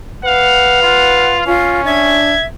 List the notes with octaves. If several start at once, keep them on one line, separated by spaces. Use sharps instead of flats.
B4 F5 F#5
F4 F#5
C#4 F4
D4 E5 G#6